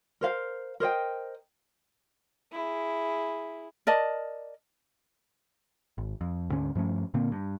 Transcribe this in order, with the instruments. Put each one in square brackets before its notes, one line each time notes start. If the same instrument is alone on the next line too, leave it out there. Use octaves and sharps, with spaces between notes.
[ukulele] A#4 C5 F5
A#4 C5 D#5 G5
[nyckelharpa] E4 G#4
[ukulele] A#4 D5 D#5 A5
[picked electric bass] G#1
F2
D2 G#2 D3 C#4
G2 F3 A3 C#4
A#2 D3 A#3 C4
G2